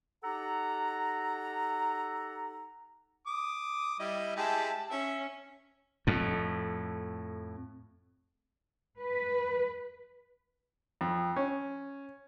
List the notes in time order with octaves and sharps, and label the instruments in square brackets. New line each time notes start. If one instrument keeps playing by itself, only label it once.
[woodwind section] D#4 G4 A4 F#5 A#5
[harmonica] D6 D#6
G3 E4 D#5
[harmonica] G#3 E4 G4 [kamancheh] A5
[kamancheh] C#4 [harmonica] E5
[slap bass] F2 A2
[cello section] B4
[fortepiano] F2
C#4